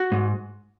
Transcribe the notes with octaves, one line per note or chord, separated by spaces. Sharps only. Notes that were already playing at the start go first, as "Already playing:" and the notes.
Already playing: F#4
G#2